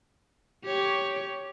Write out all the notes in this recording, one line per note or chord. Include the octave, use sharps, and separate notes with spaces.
G4 C#5